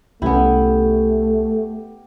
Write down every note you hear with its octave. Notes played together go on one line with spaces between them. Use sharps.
C2 G#3 A3 B3 C#4 E4 G4